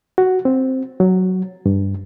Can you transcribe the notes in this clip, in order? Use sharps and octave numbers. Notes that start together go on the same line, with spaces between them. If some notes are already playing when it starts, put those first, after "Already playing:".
F#4
C4
F#3
G2